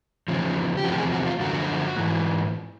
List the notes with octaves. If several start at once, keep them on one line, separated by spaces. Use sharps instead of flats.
E2 C#3 F3
G4
E2 C3 F3 F#4
G4
G#4
F#4
F4
F#2 D3 F3 F#4
G#2 E3